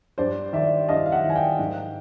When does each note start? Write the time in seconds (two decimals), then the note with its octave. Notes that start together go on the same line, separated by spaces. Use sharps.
0.18 G2 C5 D5
0.53 D#3 D5 E5
0.88 G2 D#5 F5
1.06 F5
1.12 E5 F#5
1.24 D#3
1.30 G#5
1.35 F5 G5
1.59 G#2